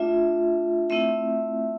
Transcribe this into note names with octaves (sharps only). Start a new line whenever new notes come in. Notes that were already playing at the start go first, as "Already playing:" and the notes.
Already playing: A3 D4 F4 E5
A3 C4 E4 E5